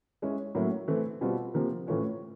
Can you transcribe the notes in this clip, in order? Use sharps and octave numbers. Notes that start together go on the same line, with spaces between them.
G#3 C#4 E4
A2 F#3 A#3 C#4 E4
E3 A3 C4
B2 G3 C4 F4
C3 F3 A#3
A2 E3 A3 C#4 F4